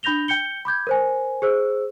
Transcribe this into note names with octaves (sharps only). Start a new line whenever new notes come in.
D4 B5 G6 A#6 F7 G7
G5 G6 C#7 G7
B5 D6 G6 G#6
A#4 C5 G#5
G#4 C5 E6